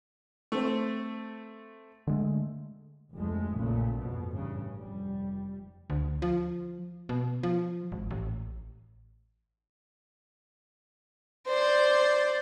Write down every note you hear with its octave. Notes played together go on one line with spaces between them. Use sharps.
A3 C4
D3 G#3 A3
F1 D2 G#3 A3
A#1 A#2 C#3 A3
F2 G#2 B2
A1 G2 C#3
F1 G3
D2
F3
B2
F3
G#1
A1
C5 D5